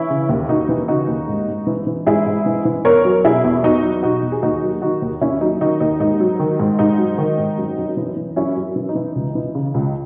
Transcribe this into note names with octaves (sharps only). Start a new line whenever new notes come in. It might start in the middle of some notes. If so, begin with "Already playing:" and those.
Already playing: E3 C#4 E4
C#3
D#2
D#2 D#4 F#4
E3
C#3 D#4 F#4
D#2
G#2
G#2
E3
E3
G#2 E4 G#4
G#2
E3
E3
E2 A#4 C#5
F#3
B2 E4 G#4
E2
E2 D#4 F#4
F#3
B2 D#4 F#4
E2
G#4
D#2 D#4 F#4
F#3
D#3 D#4 F#4
D#2
D#2 C#4 E4
F#3 D#4
D#3 D#4 F#4
D#2 D#4
G#2 D#4
F#3
D#3
G#2
G#2 D#4
F#3
D#3
G#2
F#2
F#2
E3
E3
F#2 C#4 E4
F#2
E3
D#4
E3
C#2
E3
C#3
C#2